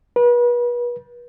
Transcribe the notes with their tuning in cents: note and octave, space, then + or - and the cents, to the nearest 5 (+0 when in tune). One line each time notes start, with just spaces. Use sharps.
B4 -35